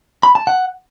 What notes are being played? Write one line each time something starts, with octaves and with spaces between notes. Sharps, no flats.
B5
A5
F#5